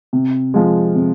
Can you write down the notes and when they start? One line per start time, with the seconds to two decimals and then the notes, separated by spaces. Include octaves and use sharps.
0.13 C3
0.54 F3 G#3
0.95 C3